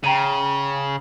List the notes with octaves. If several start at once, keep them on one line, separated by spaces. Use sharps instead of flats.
C#3 G5 A#5 D#7